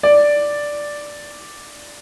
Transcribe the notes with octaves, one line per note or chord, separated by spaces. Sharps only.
D5